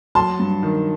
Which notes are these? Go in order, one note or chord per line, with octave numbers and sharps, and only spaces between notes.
F#3 A5 C6
G2
D#3